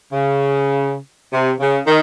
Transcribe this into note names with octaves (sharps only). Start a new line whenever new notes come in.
C#3
C3
C#3
D#3